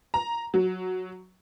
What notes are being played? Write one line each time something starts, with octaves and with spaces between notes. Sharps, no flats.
A#5
F#3